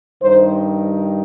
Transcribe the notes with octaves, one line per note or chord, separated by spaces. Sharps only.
G2 D#3 G3 C5